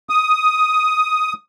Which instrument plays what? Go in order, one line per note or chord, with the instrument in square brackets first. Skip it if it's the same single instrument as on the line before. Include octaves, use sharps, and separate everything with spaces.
[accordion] D#6